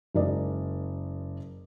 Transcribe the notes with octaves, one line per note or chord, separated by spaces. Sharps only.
F#1 G#3 A#4 D5 D#5